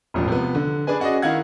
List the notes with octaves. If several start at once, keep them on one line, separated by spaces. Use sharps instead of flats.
E1 A1 F3
C3 F3 B3
D3
D4 G#4 B4 G#5
C#4 F#4 G#4 D5 D#5
D#3 E4 F5 F#5 G#6